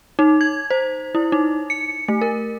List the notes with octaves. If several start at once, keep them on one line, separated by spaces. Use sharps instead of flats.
D#4
G#6
C5
E4
D#4
C#7
A3
A#4